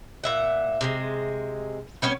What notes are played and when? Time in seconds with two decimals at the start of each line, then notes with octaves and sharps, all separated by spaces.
0.24 A#2 E5 F#5
0.81 C3 G3 G#3
2.02 G3 B3 C#4 C#5